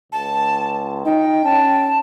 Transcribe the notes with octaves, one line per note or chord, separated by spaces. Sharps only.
C#2 A5
D#4 G5
C#4 A5